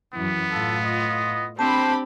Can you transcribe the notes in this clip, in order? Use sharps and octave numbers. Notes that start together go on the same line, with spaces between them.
F#2 E3 B3
A2 F4 A4
D#5
C4 D4 G4 C5 A5 B5